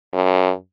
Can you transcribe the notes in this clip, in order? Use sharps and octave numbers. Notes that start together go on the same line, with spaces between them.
F#2